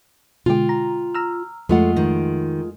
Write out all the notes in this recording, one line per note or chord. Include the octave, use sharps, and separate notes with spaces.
B2 D3 G#3 F4 G5
A#5
A#5 E6 F6
F2 F3 G#3 A3 F4 F#5
D#3